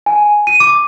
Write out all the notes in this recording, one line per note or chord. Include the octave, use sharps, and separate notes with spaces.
G#5
D#7
D6